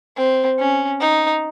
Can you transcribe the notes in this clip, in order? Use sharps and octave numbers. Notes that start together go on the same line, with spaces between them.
C4
C#4
D#4